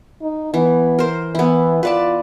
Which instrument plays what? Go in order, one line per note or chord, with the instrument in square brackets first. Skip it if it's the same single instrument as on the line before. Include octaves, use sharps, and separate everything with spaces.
[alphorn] D#4
[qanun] E3 [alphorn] B3
[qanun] A#4 C5
[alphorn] E3 [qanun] B3 E4
[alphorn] F4 [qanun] B4 D5 A5